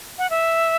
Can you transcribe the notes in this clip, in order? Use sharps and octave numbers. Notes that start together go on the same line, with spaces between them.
F#5
E5